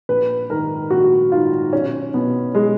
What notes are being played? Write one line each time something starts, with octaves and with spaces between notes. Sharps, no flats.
A#1 B4
G#2 D#3 A#4
A#1 F#4
G#2 D#3 F4
B1 C#4
B2 B3
G#3